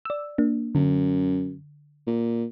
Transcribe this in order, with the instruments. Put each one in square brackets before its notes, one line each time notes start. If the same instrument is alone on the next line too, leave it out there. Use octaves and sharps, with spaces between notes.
[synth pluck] D5 E6
A#3 D4
[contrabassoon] F#2 [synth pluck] D3
[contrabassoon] A#2